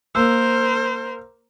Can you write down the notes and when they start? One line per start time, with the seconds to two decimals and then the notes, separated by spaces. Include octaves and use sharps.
0.15 A#3 A#4 C5 E6